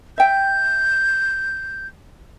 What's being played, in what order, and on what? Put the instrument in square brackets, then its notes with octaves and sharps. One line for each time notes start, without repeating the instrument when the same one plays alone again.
[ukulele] E5 G5 [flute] G6